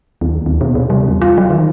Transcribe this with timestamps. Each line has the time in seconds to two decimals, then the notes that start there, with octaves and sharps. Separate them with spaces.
0.21 D#2
0.46 D#2
0.61 B2
0.75 C3
0.90 G3
1.08 E2
1.22 F4
1.38 F#3
1.50 D#3